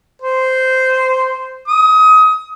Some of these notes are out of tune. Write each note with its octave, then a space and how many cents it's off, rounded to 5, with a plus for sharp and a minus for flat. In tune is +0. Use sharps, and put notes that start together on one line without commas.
C5 -10
D#6 +25